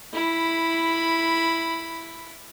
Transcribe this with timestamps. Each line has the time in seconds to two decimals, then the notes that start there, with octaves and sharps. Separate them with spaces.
0.14 E4 B5